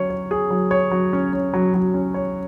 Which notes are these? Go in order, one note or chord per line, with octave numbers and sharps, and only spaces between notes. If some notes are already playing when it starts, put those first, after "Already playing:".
Already playing: F#3 C#4 C#5
C#5
G#4
F#3
C#5
F#3
C#4
C#4
F#3
F#3
C#4
C#5